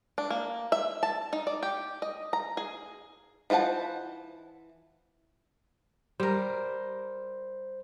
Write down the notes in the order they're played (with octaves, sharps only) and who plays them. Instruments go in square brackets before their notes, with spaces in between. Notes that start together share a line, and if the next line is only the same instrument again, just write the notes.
[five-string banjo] D4
A#3
E5
A5
D#4
D5
G4
D#5
A#5
G#4
E3 F4 C5 F#5 A5
[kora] G3 A#4 [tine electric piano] C5